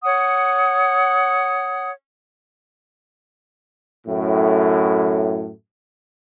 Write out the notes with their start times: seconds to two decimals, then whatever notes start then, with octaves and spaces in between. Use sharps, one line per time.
0.03 C#5 F#5 D#6
4.07 F#2 A2